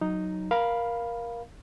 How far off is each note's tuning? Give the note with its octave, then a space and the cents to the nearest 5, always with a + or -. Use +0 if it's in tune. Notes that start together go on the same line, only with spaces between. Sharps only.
F#3 +0 D#4 +0
A#4 +15 F5 +0 B5 -5